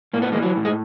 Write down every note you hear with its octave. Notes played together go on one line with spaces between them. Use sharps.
A2 A#3
B3
E3 G#3 A#3
F#3
A2
G#3